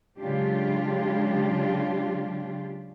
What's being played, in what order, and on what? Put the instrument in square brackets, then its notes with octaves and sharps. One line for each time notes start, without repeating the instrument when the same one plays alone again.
[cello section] C#3 F#3 G#3 D4 F4 G4